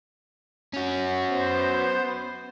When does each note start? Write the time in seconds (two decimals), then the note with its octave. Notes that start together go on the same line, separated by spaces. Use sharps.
0.73 C#4 F#4
1.28 B3 C5